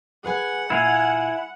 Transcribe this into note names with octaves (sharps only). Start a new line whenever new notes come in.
G#4 B4 F#5 G#5
A#2 E4 F5 G#5